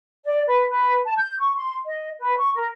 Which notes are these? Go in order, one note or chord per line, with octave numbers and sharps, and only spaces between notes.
D5
B4
B4
A5
G6
C#6
C6
D#5
B4
C#6
A#4